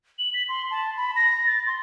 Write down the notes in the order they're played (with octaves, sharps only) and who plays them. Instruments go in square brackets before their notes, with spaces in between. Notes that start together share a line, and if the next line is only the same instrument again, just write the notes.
[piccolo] F#7
B6
C6
A5
B5
A#6
A6
C6